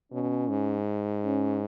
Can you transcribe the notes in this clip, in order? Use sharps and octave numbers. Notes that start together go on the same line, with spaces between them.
B2 C#4
G#2
C#4